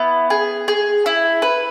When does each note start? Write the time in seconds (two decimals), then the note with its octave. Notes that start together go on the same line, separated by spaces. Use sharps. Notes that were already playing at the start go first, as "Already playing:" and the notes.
Already playing: B3 E4
0.30 G#4
0.68 G#4
1.06 E4
1.42 B4